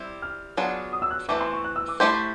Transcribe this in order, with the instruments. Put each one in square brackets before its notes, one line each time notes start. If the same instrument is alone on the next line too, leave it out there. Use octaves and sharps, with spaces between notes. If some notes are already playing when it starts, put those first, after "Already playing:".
Already playing: [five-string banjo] G3 C4 E4
[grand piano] F6
[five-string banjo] F#3 B3 D4 F4 G#4
[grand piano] D#6
E6
F#6
[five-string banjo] E3 A3 C4 E4 [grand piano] D6
[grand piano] C6
C#6
F#6
E6
D6
[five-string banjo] A3 C#4 E4 G4 C5 [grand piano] D6
[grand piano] C#6